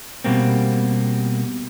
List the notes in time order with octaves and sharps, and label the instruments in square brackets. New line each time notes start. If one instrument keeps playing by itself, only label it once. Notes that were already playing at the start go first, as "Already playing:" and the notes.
[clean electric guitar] B2 G3 A#3 C4